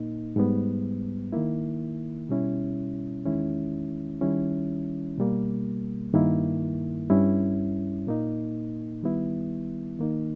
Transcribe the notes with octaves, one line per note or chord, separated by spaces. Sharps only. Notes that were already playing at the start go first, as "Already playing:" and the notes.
Already playing: A#2 A#3 D#4
G#2 G3 B3
D#3 A#3 E4
B2 G3 C#4 E4
E2 D#3 G#3 C#4 E4
D#3 G3 C#4 E4
B2 G3 A#3
G2 D#3 A#3 E4
G2 G3 C#4 E4
A#2 A#3 D#4
D#3 G3 B3 E4
D#3 A#3 D#4